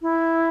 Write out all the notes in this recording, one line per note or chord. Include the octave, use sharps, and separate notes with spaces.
E4